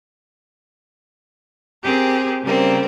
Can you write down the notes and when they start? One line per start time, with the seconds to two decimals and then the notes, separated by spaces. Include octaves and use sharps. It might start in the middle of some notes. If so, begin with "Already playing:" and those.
1.83 C4 G4 G#4 A#4
2.43 C#3 G3 A#3 C4